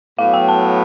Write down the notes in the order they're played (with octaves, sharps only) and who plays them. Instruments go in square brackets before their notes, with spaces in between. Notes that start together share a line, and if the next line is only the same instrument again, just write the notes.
[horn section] A2 F#3 B3 [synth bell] F5
[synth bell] G5
A5